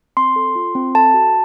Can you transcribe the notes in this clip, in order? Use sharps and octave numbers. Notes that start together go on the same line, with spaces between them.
C4 C6
A4
F4
C4
A4 A5
F#4